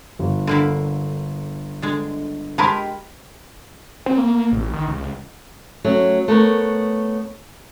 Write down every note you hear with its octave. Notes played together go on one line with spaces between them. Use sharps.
G1
D3 A#3 E4
D3 G#3
G#3 G4 A#4 A5 B5 C6
C4
A#3
A1
D#3
C#2
F#3 A3 C#4
A3 B3 A#4 C#5